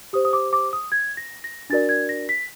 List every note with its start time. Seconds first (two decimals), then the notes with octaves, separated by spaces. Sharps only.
0.13 G4 C5 D#6
0.25 D#6
0.33 D6
0.53 D6
0.73 D#6
0.92 G#6
1.17 A#6
1.44 A#6
1.70 D4 F#4 A#4 D5 A6
1.89 G#6
2.09 A#6
2.29 B6